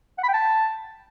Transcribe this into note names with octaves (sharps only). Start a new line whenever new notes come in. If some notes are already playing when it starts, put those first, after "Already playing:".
F#5
B5
G5
A5